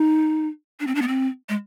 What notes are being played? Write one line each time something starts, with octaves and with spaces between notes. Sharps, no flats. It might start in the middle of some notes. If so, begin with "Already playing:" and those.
Already playing: D#4
D4
C4
D4
B3
C4
G#3